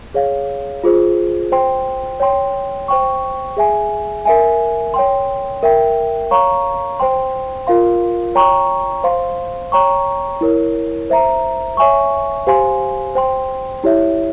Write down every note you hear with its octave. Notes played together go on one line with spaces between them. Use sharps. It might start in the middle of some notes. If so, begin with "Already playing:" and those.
G#4 C#5 F5
F4 G#4 C5
C5 G5 C6
C#5 G5 C6
C5 G5 C#6
G#4 E5 G#5
A#4 E5 G#5
C#5 G5 C6
A#4 E5 G5
C#5 F5 A#5 C#6
C5 G5 C6
F4 A#4 F5 C6
C#5 G5 A#5 C#6
C5 F5 C6
C#5 G5 A#5 C#6
E4 A#4 C#5
C5 E5 A#5
C#5 E5 G#5 C#6
G4 C5 F5 G#5 C6
C5 G5 C6
E4 G4 C#5 E5